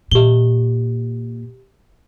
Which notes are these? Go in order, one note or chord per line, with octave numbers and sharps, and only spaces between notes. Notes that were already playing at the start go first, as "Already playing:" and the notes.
A#2 G4 G7